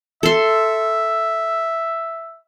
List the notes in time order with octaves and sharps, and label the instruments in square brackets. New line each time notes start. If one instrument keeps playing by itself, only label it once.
[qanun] A4 C6 [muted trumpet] E5